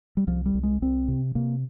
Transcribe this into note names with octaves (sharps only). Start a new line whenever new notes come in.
G3
C2 F3
G3
C2
G#3
C2 C4
C3
C3 A#3